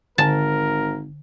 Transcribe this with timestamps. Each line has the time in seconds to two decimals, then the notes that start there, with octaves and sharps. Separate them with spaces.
0.18 G#1 D3 A#4 G#5 A5